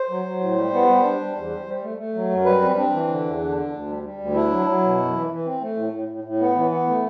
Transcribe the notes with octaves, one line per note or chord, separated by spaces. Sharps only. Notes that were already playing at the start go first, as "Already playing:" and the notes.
Already playing: C5
F#3
F#3
A2
G3
B3
G3
D4
G3
E2
G3
G3
A3
A3
F#3
F#2
G3 B4
C4
C4 D4
E3
D3
E2
D3
D4
D2
G3
G3
D2
D4 E4
F#3
F#3
B2
F#2
E3
E3
C4
A3
A2
A2
A2
A2
B3
E3
B3
A3